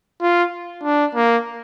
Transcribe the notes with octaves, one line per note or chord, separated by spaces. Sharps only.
F4
D4
A#3